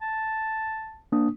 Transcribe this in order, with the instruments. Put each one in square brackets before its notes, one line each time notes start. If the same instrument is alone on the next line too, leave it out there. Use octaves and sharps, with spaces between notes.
[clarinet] A5
[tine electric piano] A#3 D4 D#6